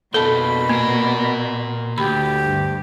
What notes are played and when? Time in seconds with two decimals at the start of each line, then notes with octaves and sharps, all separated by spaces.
0.14 F2 B2 A#3 A4 A5 B5
0.69 A#2 A#3 A#4
1.98 D2 G4 B5
2.44 G2